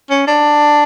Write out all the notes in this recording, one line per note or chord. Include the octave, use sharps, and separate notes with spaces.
C#4
D4